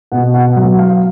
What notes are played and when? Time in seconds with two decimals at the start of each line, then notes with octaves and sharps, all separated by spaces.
0.12 B2 F#5
0.34 F#5
0.56 F#3 F#5
0.79 F5